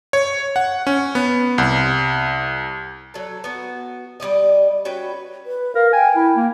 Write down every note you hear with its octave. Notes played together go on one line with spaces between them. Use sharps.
C#5
F#5
C#4
B3
C2
F#3 A4
B3 F#4
G3 C#4 D5 D#5
C#4 F#4 B4 G5
B4
A#4 F5
G5 G#5
E4
A#3